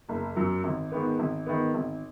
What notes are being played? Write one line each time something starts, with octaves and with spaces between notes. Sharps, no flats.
F#1
F#2 F#3
G#1
G#2 D#3 B3
G#1
G#2 D#3 B3
G#1